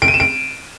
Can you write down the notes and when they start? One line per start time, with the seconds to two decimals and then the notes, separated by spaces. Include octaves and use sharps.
0.02 D7
0.08 D#7
0.14 E7
0.20 D7